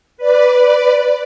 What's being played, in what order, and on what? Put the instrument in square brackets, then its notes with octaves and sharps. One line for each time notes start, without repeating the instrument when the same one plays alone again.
[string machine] B4 D5